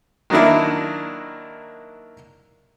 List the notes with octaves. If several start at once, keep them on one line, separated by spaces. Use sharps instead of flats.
D#3 F#3 A#3 D4 E4